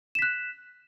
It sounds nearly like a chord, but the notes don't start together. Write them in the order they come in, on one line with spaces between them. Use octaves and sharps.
E7 B6 F#6